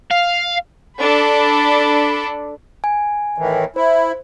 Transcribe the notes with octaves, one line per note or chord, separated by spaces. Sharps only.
F5
D4 A4 B5
G#5
A2 D#3 E3
E4 C5